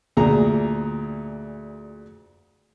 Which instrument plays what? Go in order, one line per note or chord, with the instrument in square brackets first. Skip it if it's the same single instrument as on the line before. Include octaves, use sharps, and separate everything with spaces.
[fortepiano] D2 A#2 G#4 A#5